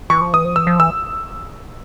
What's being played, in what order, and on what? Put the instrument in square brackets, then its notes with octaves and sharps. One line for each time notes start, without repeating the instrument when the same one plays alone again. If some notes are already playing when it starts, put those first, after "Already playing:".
[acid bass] E3 [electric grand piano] C#6
[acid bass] F3
[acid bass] E3 [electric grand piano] D#6
[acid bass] F3
[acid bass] E3 [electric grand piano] E6
[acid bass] F3
[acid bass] E3 [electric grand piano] E6